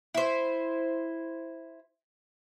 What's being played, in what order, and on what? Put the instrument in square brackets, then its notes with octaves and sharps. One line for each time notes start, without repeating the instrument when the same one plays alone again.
[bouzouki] E4 C5